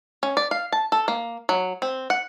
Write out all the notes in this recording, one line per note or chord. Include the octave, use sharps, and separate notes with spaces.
C#4
D5
F5
A5
A4
A#3
F#3
C4
F#5